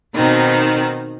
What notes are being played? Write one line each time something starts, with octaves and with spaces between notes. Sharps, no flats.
B2 D#3 C4 D#4